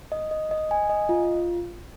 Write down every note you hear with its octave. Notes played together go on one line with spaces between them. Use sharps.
D#5
D#5
D#5
G#5
D#5
F4